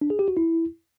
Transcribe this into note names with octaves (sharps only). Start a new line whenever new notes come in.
D4
G#4
G4
F#4
E4